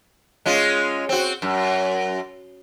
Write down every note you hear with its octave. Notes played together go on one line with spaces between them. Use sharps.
G#3 C#4 F4
C4 F#4
F#2